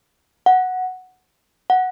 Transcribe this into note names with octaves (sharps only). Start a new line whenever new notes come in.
F#5
F#5